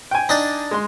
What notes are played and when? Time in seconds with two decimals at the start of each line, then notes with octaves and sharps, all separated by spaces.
0.11 G5 G#5
0.29 D4 D#4
0.71 G#3 C6